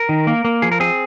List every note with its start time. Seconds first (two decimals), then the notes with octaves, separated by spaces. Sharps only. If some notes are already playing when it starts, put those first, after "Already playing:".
Already playing: A#4
0.09 D#3
0.27 A#3
0.45 A#3
0.62 F3 G#4
0.72 A#4
0.80 C4 G#4